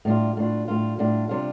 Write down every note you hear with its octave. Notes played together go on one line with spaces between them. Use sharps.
A2 G3 D4 F4
A2 G3 D4 F4
A2 G3 D4 F4
A2 G3 D4 F4
C3 G3 D4 F4